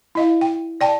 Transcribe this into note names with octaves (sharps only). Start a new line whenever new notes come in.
E4 D#5 F5
G5
D5 G5 A5